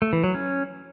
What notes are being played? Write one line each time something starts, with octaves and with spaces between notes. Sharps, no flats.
A3
E3
F#3
C#4